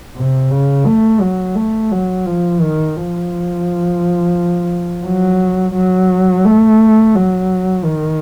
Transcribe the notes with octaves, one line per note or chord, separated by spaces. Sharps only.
C3
C#3
A3
F#3
A3
F#3
F3
D#3
F3
F#3
F#3
A3
F#3
D#3